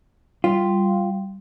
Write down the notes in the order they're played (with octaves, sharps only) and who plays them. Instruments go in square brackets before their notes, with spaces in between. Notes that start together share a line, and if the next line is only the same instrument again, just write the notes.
[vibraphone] G3 [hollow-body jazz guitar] F4